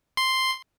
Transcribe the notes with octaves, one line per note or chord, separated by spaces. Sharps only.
C6